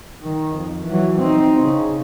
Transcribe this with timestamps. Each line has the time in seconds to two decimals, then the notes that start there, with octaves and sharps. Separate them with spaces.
0.22 D#3
0.56 F2
0.86 E3 F#3
1.19 C4 D#4
1.61 C#3